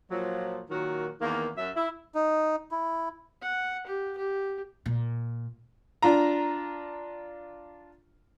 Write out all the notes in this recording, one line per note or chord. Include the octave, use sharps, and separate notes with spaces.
A#2 F3 F#3
A#2 D#3 F#3 F#4
E2 D#3 A#3
F#2 E5
E4
D#4
E4
F#5
G4
G4
A#2
D4 F4 A#5